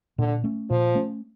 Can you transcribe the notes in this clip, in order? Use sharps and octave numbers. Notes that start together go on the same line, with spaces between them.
A#2 D3
A3 C#4
A#2 F3
A3 C#4